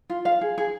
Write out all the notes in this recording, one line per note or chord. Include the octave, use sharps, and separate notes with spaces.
F4
F5
G#4
G#4